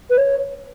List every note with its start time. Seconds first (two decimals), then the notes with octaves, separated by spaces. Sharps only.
0.10 B4
0.18 C#5